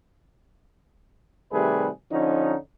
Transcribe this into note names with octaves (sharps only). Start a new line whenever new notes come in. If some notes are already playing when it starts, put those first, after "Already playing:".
C3 D#3 G3 A3 G#4 B4
D3 F3 C#4 D#4